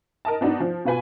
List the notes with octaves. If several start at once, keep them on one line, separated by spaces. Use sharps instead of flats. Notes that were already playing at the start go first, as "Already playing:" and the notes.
A#4 D#5 A5
B3 D4 D#4 F#4
F3
B2 F4 B4 G#5